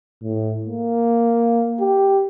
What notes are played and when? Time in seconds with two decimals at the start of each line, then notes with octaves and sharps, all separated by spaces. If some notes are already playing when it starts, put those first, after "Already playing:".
0.23 A2
0.66 A#3
1.80 G4